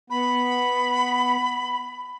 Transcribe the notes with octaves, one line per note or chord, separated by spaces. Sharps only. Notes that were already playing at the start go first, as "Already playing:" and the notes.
B3 B5